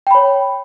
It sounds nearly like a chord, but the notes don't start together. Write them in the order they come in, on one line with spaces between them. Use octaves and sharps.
G5 B5 C#5